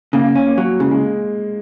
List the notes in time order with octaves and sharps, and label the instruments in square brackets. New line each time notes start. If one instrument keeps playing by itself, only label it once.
[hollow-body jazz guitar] C#3 [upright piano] A#3
[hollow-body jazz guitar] C#4
[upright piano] A#3
[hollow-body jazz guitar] F#3
[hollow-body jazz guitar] C#3 [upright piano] G#3
[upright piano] G#3